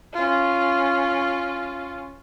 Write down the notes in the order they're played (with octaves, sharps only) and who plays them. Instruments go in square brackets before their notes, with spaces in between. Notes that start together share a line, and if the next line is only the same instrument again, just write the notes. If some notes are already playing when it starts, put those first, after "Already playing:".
[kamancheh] C#4 F4